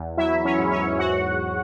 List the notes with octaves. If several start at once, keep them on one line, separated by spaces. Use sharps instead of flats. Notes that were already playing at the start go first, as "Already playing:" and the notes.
Already playing: E2
F#3 E4 E5
C#4 C#5
G#2
C#4 C#5
E2 F#4 F#5